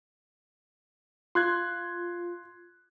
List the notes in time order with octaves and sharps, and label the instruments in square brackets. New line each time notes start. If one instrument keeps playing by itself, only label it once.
[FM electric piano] F4 [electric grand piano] C6 F#6 G#6